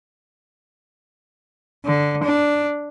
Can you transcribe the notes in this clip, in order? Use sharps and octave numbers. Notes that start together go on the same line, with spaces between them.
D3
D4